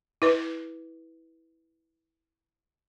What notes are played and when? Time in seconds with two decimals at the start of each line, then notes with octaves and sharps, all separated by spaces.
0.22 E4 B4